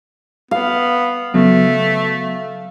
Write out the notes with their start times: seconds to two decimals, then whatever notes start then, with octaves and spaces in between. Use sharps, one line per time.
0.51 B3 F5
1.34 C#3 F#3 A3 B3